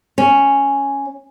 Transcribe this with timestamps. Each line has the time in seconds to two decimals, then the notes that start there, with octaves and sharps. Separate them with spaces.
0.18 C#4